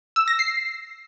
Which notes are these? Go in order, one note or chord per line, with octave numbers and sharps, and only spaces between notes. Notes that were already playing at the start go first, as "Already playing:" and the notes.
E6
A#6
C7